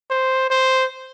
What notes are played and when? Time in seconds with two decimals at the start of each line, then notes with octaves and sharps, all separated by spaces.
0.11 C5
0.50 C5